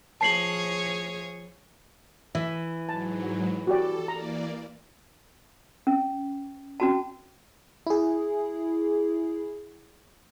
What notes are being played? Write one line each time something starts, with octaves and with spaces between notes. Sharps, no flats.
F3 G#4 C#5 A5 C7 F#7
E3 E5
G#2 F#3 A5
F#4 G4 A4 D5
E3 A#3 D5 A#5
C#4
C#4 F#4 A5
E4 G#4